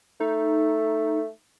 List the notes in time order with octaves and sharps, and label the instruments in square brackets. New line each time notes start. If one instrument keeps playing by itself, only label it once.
[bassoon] A3 [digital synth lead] D#4